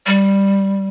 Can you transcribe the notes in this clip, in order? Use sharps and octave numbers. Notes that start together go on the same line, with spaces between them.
G3